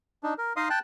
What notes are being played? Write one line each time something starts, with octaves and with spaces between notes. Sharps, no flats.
D4 D#4
A#4
D#4 D#5 F5 C6 D#6
G5 A5 F#6